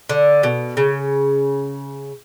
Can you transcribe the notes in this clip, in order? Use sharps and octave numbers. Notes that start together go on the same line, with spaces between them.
D3
B2
C#3